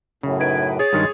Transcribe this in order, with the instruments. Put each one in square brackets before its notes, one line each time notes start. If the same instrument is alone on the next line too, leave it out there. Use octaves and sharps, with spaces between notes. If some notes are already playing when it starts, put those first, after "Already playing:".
[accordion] F#2 A2 [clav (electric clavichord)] C#3
[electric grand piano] D#4 B4 D7 [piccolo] G#6
[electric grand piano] G#4 C#5 [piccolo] A6
[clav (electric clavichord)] G2 D#3 [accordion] G#3